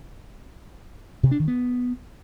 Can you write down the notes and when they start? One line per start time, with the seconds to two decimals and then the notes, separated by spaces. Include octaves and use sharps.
1.23 C3
1.31 D4
1.40 D#3
1.48 B3